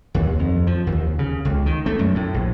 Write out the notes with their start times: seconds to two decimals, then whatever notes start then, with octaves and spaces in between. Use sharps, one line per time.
0.14 D#2
0.39 F2
0.67 F3
0.87 D#2
1.19 C#3
1.45 C#2
1.66 D#3
1.86 A3
1.99 F#2
2.15 A2
2.34 A#1